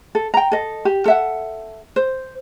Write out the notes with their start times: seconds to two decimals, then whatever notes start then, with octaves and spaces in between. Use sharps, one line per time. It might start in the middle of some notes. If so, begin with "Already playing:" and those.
0.15 A4
0.34 G5 A#5
0.52 A4 D#5
0.85 G4
1.05 A4 E5 F#5
1.96 C5